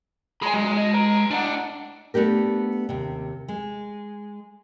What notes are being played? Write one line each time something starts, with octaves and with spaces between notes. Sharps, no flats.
G#4 G#5 B5 C6
G2 F#3 G#3
F#4 D#5
B4 A#5
A2 D4 F#5
A3 B3 D4 G4 A#4
D#2 C3
G#3